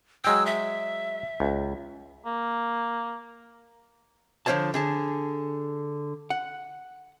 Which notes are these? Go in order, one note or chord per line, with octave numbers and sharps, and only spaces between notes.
F#3 G#3 G5 E6
E5
C#2
A#3
D3 F3 F4 C5 C#5 A5
D3 G#4 A5
F#5